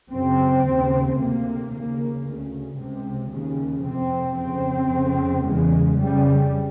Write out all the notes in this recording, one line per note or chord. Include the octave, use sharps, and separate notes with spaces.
F#2 C#3 C4
D#2 C#3
D2 C3 A#3
D#2 C#3 A#3
D2 C#3
C#2 C3
D#2 C#3
F2 C3 C4
F2 C#3 C4
F2 C#3
E2 C#3 G#3
F2 C#3 G3